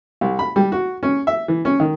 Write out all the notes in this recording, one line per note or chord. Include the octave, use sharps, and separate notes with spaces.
C2
B5
G3
F#4
C#4
E5
E3
C#4
D#3